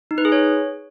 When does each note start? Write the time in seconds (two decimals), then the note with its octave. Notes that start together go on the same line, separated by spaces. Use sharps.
0.11 D#4
0.18 B4
0.25 G#4
0.32 C#5